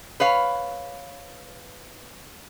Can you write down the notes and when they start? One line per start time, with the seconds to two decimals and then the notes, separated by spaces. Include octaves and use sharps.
0.20 B4 C#5 F5